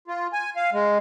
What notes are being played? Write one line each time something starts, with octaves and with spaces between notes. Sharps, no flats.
F4
G#5
F5
G#3